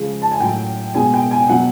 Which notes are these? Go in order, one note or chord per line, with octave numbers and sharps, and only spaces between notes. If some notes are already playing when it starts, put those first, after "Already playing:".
Already playing: C#3 F3 G#3
A5
G#5
A2 F#3 G5
B2 G#3 G#5
G5
G#5
B2 F#3 F#5